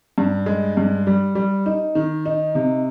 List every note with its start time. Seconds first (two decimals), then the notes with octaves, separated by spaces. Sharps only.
0.18 G2
0.46 G#3
0.77 G2
1.07 G3
1.35 G3
1.66 D#4
1.95 D#3
2.26 D#4
2.55 C3